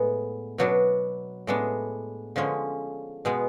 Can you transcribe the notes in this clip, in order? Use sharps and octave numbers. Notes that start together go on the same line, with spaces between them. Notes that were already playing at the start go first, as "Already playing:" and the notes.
Already playing: A2 G#3 B3
B2 F#3 B3 D4
A2 G#3 B3 D4
D3 F3 G#3 C#4
B2 G#3 B3